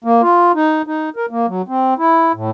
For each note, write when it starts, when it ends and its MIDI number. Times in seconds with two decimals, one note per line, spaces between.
0.04 0.22 58
0.22 0.52 65
0.55 0.82 63
0.87 1.10 63
1.16 1.26 70
1.31 1.46 58
1.48 1.62 54
1.68 1.94 60
1.98 2.32 64
2.34 2.50 45